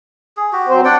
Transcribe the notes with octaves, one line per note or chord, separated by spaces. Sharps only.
G#4
F#4 G4
F#3 C4 C5
D4 D5 F#5 G5